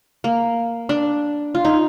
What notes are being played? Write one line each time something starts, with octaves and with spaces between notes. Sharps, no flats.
A#3
D4
F4
D#4